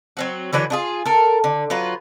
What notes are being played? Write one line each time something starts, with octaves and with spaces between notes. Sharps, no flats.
F#3 C4 F#4
D3 E3 F#3 B4
D4 F4 G#4
A4 A#4
D3
F#3 F4 B4